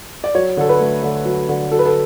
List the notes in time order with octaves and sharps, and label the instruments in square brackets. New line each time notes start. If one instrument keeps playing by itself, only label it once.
[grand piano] D5
F#3 C#5
D3 A4
B4
A3
D3
F#3
D3
F#3 A4
B4
A4